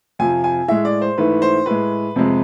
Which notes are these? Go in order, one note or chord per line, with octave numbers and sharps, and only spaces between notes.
F2 C3 F3 G#5
G#5
A2 G#3 E5
D5
C5
G#2 E3 A3 B4
C5
A2 G#3 B4
F2 C3 G#3